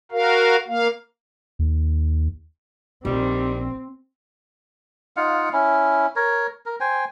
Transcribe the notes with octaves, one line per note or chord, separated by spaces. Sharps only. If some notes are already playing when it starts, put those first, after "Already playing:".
F#4 A#4 F5
A#3 F5
D#2
A#1 D#3 G3 C4
D#4 F4 F5 F#5
C#4 E4
A#4 C#5
A#4
C5 G5 G#5